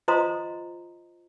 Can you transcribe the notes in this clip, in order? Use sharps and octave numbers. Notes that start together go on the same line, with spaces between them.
F4 C5 D#5 A#5 C6 D#6